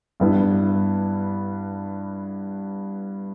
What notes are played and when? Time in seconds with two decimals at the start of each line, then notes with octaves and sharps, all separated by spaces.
0.20 G2 G3 B3 E4